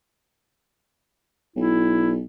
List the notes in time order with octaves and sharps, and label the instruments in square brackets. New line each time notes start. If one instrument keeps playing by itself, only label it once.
[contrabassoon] B1 [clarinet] E4